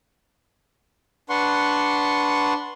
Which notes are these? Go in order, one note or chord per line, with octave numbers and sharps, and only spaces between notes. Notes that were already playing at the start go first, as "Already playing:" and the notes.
D4 B4 F#5 C6 C#6